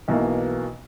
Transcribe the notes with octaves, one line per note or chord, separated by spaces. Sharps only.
B1 B2 E3 A#3 B3